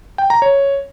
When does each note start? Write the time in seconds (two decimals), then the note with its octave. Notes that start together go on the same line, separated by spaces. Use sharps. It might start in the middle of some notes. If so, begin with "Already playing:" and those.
0.18 G5
0.30 A#5
0.42 C#5